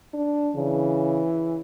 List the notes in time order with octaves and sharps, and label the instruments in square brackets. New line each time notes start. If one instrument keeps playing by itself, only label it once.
[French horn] D4
[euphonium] C#3 [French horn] E3